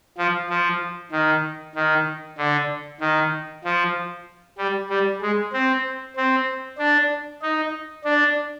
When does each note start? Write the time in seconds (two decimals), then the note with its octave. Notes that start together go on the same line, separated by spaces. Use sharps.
0.18 F3
0.49 F3
1.12 D#3
1.75 D#3
2.38 D3
3.01 D#3
3.64 F3
4.58 G3
4.89 G3
5.22 G#3
5.53 C4
6.17 C4
6.78 D4
7.42 D#4
8.05 D4